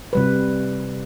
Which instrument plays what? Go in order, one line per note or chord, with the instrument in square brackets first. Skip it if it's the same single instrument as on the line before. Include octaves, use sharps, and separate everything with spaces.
[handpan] C3 G3 B4